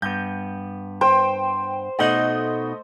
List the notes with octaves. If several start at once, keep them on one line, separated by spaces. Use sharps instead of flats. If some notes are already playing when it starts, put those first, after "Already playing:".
G2 B3 G6
C5 G5
B2 A3 D#4 D#5 F#5